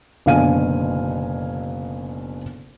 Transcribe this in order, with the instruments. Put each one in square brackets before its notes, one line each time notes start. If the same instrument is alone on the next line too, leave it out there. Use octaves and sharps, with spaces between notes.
[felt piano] F#1 B2 D3 F5 G#5 D#7